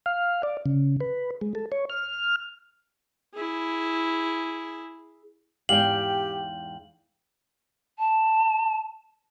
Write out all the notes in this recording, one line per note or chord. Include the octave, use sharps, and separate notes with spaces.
F5
D5
C#3
B4
G#3
A4
C#5
F6
E4 G#4
E2 G#2 G4 D5 F5 G5 F#7
A5